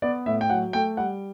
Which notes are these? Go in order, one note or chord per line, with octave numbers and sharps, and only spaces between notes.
B3 D5
A2 E5
G5
F#3 F#5
A3 G5
G3 F#5